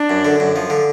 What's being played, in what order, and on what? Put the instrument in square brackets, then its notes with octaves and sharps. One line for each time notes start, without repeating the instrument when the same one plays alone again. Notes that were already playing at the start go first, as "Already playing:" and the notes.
Already playing: [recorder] D4
[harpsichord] F#2
D3
F#2
F3
D3